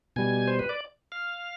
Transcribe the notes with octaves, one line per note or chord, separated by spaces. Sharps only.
B2 G3 G#5
C5
B4
D5
F5